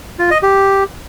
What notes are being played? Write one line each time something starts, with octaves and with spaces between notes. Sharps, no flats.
F4
D#5
G4